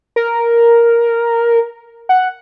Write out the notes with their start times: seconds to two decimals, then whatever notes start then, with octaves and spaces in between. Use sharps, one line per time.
0.16 A#4
2.09 F#5